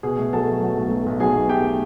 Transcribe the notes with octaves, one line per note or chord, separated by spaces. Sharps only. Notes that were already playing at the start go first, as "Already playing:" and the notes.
B2 G#4 G#5
A3
F#3 A4 A5
A3
F#3
B1
A3
B1
F#3 G#4 G#5
B1
A3 G4 G5